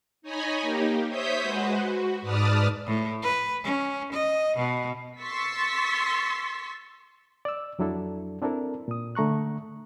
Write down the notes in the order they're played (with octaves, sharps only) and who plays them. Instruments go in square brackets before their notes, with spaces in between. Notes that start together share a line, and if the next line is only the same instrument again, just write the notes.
[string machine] D#4 C#5 D#5 G#5 B5
A#3 D#4 G4
C5 C#5 E5 D#6 G6 B6
G#3 F#4 B4 C5
F#4
G#2 B4 D5 A5 D#6 F6
[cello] A2
B4
C#4
D#5
B2
[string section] C6 C#6 E6 A6 B6
[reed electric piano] D5 E6
F2 F#3 D4 E4 A4
C4 D4 E4 A4 A#4
A#2 D#6
D3 A3 A#5 C#6 F#6